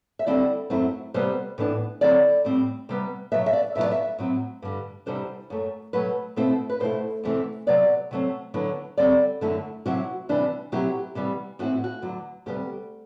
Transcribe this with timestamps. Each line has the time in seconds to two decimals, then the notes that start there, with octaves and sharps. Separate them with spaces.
0.19 E5
0.26 D2 D3 G3 C4 E4 D5
0.70 F#2 F#3 A3 C4 E4
1.14 C3 G3 B3 C5
1.58 A2 E3 B3 D4
2.01 D3 F#3 C4 E4 D5
2.45 A2 G3 C4
2.89 C3 G3 B3
3.32 B2 F#3 B3 E5
3.46 E5
3.53 D5
3.75 E2 B2 F#3 B3 E4 E5
3.83 D5
3.92 E5
4.19 A2 F#3 C4
4.62 G2 D3 G3
5.06 E2 C3 G3 D4 C5
5.50 F#2 F#3 A3
5.93 B2 F#3 A3 B4
6.36 B2 A3 C4 E4 C5
6.70 B4
6.80 B2 A3 E4 C5
7.24 E2 C3 E3 A3 C4
7.67 C3 F#3 B3 D5
8.11 C3 F#3 A3 C4
8.54 D3 F#3 B3 E4
8.97 D3 G3 C4 D5
9.41 F#2 D3 A3 E4
9.86 C3 F#3 C4 E4 F#4
10.29 C3 E3 G3 D4
10.72 B2 F#3 C4 E4 G4
11.15 C3 E3 G3 B3
11.59 A2 E3 A3 C4 E4 F#4
11.84 F#4
12.02 E2 D3 F#3
12.46 D2 C3 G3 B3 G4